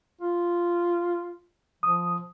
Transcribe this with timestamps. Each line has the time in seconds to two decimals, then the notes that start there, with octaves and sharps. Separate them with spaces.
0.21 F4
1.83 F3 D#6